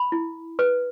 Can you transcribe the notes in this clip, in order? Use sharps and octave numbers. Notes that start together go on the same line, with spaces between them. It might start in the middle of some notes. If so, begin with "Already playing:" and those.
Already playing: B5
E4
B4